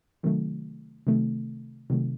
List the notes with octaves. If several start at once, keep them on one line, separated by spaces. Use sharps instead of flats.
C3 D#3 F#3 A3
C3 D#3 F#3 A3
C3 D#3 F#3 A3